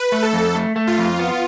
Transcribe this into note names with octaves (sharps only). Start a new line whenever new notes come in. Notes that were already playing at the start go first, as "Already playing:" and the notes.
Already playing: B4
A3
A4
F2
A3
A3
F4
F2
B3